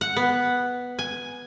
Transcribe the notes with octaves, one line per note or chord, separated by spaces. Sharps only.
F#5
B3
G#5